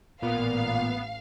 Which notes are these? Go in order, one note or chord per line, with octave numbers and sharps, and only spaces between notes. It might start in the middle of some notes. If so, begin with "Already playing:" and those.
A1 A#2 B3 F5